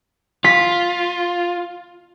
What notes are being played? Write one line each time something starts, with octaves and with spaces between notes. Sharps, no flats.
F4 B6